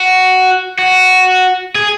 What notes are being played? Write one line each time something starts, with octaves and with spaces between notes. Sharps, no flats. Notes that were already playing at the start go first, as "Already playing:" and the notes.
Already playing: F#4
F#4
G#4